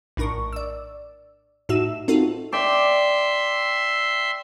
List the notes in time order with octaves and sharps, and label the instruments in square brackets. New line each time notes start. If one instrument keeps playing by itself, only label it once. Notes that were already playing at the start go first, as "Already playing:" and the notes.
[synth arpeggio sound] A#1 A2 D4 A#4 C#6
D5 E6
A2 D#4 F#4 E5 E6 E7
C4 D#4 F4 F#4 A4
[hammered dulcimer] D5 G5 [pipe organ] E5 C6